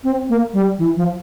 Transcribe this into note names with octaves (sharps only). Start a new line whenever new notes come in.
C4
A#3
G3
E3
F3